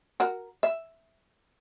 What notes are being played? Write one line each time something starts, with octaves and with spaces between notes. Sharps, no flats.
F#4 A#4
E5